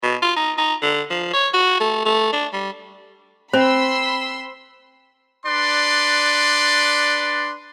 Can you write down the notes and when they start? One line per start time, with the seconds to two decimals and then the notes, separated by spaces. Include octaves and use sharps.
0.03 B2
0.22 F4
0.37 D#4
0.58 D#4
0.82 D3
1.10 F3
1.33 C#5
1.53 F#4
1.80 A3
2.05 A3
2.33 D4
2.53 G3
3.53 C4 C5 B5 C6 E6
5.46 D4 B4 D5 C6